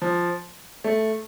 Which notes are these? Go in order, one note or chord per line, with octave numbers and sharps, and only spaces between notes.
F3
A3